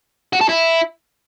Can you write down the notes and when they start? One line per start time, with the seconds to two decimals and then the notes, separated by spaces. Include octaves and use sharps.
0.33 F#4
0.41 A4
0.49 E4